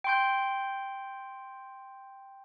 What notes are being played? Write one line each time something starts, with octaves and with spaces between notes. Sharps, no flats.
G5 C6 G6